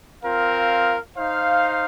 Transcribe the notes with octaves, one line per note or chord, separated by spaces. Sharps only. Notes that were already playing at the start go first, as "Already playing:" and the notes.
C4 F4 A#4 F5
D#4 C5 F5